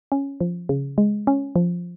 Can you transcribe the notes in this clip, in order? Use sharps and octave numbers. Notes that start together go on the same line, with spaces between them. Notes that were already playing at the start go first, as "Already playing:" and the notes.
C#4
F3
C#3
G#3
C#4
F3